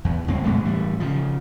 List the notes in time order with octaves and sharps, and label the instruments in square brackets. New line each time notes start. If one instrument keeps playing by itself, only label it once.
[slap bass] E2
C#2 G2 A#3 C4
F#2 B2 G#3 A3
A2 E3 G3
C#3 F3